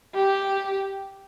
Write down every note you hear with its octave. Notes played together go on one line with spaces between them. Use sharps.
G4